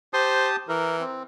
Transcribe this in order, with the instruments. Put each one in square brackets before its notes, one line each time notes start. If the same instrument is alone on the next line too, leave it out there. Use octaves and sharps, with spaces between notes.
[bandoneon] G4 A5 D#6 [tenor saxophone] C5
[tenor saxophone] E3 [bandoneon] A#4
[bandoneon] C4